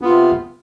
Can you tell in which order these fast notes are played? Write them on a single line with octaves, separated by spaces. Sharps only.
B3 F4 C3